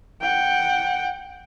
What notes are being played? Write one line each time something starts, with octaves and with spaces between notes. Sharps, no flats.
F#5 G5